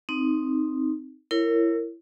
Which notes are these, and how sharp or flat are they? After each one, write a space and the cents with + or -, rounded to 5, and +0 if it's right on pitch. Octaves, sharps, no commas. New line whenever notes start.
C4 +0 D#4 +0
E4 +20 A#4 -20 C#5 -10